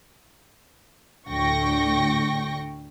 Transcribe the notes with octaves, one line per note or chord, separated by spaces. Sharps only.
D2 A2 D3 G5 C#6 A#6